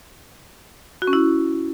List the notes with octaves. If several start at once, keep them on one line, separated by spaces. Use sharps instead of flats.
F#4
C#4
E4